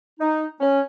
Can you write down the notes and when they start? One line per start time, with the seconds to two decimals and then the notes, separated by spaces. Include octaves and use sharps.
0.20 D#4
0.61 C#4